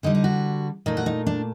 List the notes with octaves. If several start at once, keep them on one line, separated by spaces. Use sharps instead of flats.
D3 G3 D#4
D#4
F#4
A#2 A3 D#4
F#4
D#4
D4